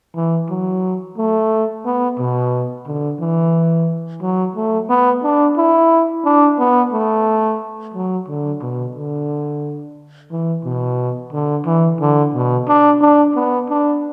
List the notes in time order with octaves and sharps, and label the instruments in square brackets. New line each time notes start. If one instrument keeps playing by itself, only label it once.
[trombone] E3
F#3
A3
B3
B2
D3
E3
F#3
A3
B3
D4
E4
D4
B3
A3
F#3
D3
B2
D3
E3
B2
D3
E3
D3
B2
D4
D4
B3
D4